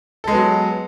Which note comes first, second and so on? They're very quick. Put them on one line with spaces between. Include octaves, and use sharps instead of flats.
A4 G#3 B3 F#3